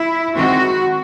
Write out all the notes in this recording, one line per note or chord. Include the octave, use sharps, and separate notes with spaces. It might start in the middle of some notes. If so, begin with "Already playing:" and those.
Already playing: E4
D#3 G#3 C4 F#4